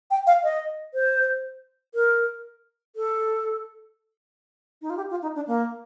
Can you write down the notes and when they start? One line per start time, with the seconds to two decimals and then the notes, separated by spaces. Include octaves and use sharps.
0.11 G5
0.27 F5
0.44 D#5
0.94 C5
1.95 A#4
2.96 A4
4.82 D#4
4.90 F4
4.97 G4
5.10 F4
5.22 D#4
5.35 D4
5.47 A#3